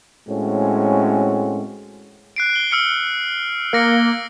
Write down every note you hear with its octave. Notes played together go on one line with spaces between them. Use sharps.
A2 G#3 C4 C#4 F#4
F#6 C7 D7
G7
E6 F6 C#7
A#3 F6 A#6 C#7